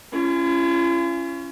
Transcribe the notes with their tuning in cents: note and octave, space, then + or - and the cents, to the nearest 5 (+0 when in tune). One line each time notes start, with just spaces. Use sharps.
C#4 +0 F4 -45